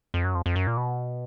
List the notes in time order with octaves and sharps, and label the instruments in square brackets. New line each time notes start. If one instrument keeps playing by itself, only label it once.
[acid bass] F2
F#2
F2
F2
F#2
A#2
B2